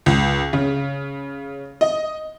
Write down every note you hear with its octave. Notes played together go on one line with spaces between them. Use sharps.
C#2
C#3
D#5